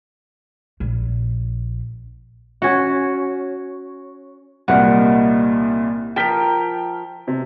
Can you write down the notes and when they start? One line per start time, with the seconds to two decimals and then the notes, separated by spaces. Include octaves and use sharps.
0.80 A#1
2.62 C#4 F#4
4.68 C2 A#2 D#3 G3 F#5
6.16 F3 A#4 G5 B6 G7
7.28 C3